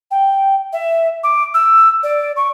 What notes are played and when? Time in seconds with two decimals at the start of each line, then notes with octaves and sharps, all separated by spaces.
0.11 G5
0.73 E5
1.24 D6
1.54 E6
2.03 D5
2.36 C#6